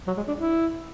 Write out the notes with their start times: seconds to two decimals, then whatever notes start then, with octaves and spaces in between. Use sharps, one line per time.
0.07 F#3
0.17 G#3
0.28 D4
0.38 E4